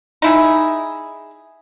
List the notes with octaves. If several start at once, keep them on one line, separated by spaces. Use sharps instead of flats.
D#4 E4 G#4